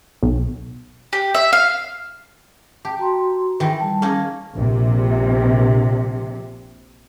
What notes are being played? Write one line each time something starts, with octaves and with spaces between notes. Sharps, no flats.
B1
G4
E5
F5
G4 A5
F#4 A#5 C6
D#3 E3
G3 A5
A#3 C#4 D#4
A#1 C3